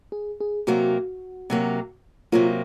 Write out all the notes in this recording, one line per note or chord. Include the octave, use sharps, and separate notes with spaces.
G#4
G#4
C3 F#3 A#3 F#4
C3 F#3 A#3
C3 F#3 A#3 F4